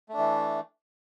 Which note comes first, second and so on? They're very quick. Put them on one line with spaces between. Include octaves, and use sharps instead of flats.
A3 D4 E3